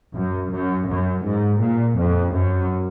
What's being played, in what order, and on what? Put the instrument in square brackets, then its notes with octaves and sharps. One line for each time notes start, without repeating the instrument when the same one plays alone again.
[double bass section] F#2
F#2
F#2
G#2
A#2
F2
F#2